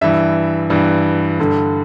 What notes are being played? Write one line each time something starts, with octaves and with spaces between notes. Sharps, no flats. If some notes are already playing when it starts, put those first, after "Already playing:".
G2 E3 E5
G2 E3
G2 D3